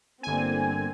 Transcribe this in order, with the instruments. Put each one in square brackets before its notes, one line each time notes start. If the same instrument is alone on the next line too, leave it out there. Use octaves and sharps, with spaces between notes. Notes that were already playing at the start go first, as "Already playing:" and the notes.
[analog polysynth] G1 G#5 [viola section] D3 A#3 C4